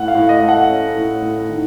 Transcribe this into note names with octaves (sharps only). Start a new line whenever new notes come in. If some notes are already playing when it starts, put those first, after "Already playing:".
Already playing: A2 F#5
F5
A2
D#5
A3
F#5
C#4
A2
A2
D#3